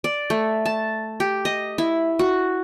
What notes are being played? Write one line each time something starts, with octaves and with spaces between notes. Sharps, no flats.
D5
A3
A5
G4
D#5
E4
F#4